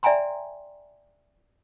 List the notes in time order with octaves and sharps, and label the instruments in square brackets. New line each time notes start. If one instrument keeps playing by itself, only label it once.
[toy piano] D5 E5 G5 G#5 A#5 C6